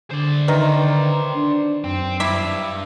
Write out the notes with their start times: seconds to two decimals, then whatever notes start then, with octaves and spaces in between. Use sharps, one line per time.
0.11 D3 C5 D5
0.48 D#3 B4 D#5 E5
1.35 D4
1.84 F#2 C4
2.20 G2 E4 E5 D6